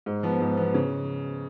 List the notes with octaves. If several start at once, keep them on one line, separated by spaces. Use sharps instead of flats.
G#2
F3 B3
G#2
F3 B3
C#3